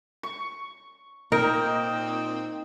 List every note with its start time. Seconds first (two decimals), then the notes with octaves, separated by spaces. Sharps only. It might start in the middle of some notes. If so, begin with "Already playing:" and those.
0.23 C#6
1.32 A#2 C4 D#4 A#4